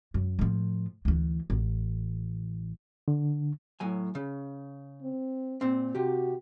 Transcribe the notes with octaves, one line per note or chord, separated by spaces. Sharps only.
F#2
A2 F3
D2 E3
A1
D3
A2 F#3 G#5
C#3
C4
A#2 C4
C3 F#4 G4